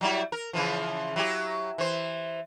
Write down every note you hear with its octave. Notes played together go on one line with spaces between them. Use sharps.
F#3 G3 E4
A#4
C#3 E3 F3
F#3 E4 G4
E3 C5